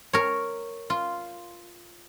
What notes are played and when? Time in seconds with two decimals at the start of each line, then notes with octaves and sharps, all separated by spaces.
0.13 A#4 C#5
0.90 F4